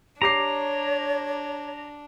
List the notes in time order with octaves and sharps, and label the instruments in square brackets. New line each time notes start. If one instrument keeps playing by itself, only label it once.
[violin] D4 [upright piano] G4 D6 C7 [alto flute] C#5 [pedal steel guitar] A#5